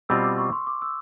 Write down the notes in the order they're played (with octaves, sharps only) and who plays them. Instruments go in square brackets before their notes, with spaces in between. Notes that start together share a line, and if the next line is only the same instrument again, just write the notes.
[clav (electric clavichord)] B2 G3 C4 F4 [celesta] E6
[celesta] D6
C#6
C6
D6
E6